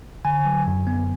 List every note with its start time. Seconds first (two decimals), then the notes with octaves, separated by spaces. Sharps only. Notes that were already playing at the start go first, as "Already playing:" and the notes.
0.25 D3 G#5
0.45 F#3
0.66 F#2
0.87 B3